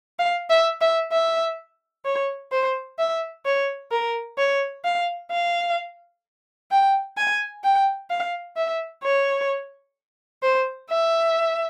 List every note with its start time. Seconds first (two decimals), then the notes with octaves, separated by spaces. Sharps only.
0.19 F5
0.50 E5
0.81 E5
1.12 E5
2.05 C#5
2.52 C5
2.99 E5
3.45 C#5
3.92 A#4
4.38 C#5
4.85 F5
5.31 F5
6.71 G5
7.17 G#5
7.64 G5
8.10 F5
8.57 E5
9.03 C#5
10.43 C5
10.90 E5